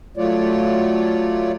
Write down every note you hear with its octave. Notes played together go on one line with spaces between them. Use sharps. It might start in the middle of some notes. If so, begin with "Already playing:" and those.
F#3 A3 F4 C#5 D5